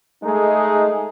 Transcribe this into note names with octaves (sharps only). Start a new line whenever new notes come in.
G#3 A3 D#4 G#4